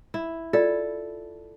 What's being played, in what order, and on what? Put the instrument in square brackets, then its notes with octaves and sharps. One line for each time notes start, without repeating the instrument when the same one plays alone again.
[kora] E4
[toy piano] F4 D5 [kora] A4